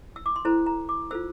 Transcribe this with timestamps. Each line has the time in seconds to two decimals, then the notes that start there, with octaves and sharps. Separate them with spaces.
0.16 E6
0.26 D6
0.36 C6
0.45 E4 A4 C5 A#5
0.66 A#5
0.89 D6
1.11 F4 A4 C5 E6